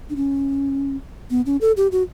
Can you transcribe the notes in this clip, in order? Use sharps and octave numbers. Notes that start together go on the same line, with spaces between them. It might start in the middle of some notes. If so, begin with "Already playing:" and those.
D4
C#4
B3
C#4
A4
G4
F#4